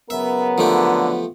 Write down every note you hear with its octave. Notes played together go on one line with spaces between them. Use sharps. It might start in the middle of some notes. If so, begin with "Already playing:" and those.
C#3 F#3 B3 A#4 E5
D3 F3 A3 G4